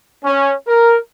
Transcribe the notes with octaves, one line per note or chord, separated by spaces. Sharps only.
C#4
A#4